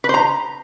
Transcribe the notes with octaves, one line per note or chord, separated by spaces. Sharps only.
B4
C5
A#5